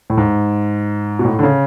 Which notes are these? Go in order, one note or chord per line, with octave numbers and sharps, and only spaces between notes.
A2
G#2
B2
A2
D3
C#3